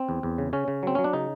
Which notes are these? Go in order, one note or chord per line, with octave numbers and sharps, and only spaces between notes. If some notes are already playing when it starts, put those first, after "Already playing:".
Already playing: C4
E2
E2
C#3
C#3 C#4
C#3
F#3 C4
F#3 C#4
D4
C#3 D#4